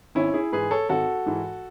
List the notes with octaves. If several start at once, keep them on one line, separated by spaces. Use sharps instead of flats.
G#1 C#4 E4
E4 G#4
G#2 E3 G#4 B4
A4 C#5
G#1 F#4 A4
G#2 E3